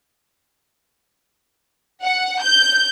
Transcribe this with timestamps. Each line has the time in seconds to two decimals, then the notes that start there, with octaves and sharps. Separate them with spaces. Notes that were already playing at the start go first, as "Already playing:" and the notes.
2.03 F#5
2.42 G6